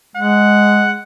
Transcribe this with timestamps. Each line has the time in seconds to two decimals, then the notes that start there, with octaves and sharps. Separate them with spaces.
0.16 G#3 F#5